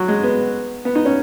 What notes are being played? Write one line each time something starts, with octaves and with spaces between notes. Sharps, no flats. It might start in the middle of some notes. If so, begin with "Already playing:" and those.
Already playing: F#3
G#3
B3
B3
D#4
C#4